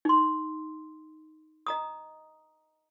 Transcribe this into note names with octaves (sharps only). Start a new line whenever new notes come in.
D#4 C6
D#5 A#5 D#6